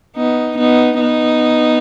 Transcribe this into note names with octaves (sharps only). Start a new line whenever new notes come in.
B3 D#4
B3 D#4
B3 D#4